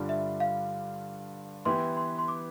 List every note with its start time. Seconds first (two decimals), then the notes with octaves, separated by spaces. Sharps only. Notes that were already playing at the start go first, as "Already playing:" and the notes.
Already playing: G2 D3 G3 D4 F4
0.09 E5
0.40 F5
1.65 E3 B3 E4 G4 C6
1.97 C6
2.19 C6
2.28 D6